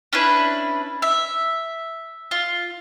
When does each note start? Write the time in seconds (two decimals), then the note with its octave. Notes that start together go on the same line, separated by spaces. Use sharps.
0.13 C#4 D4 E4 B4
1.02 E5
2.31 F4